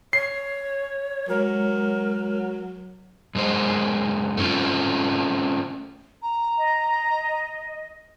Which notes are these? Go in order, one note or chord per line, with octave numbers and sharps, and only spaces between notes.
C#5 C7
F#3 G#3 A#4 C#5
F#2 G#3 C5
A3 C4 C#4 F4
A#5
D#5